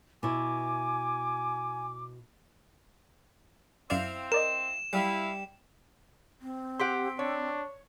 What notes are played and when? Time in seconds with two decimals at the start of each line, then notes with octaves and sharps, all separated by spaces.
0.23 B2 E4 G#5 D6
3.90 F#2 C4 E4 D5 F5
4.32 A#4 D5 D#5 E7
4.93 G3 E4 E5 F5 F#6
6.41 C4
6.80 G4 F#5 C6 B6 D7
7.19 D4 C#5